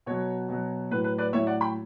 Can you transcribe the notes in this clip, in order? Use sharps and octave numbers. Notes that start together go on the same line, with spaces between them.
B2 F#3 C#5
B2 F#3
A2 F#3 B4
B4
B4 D5
A2 F#3 C#5 E5
D5 F#5
G5 B5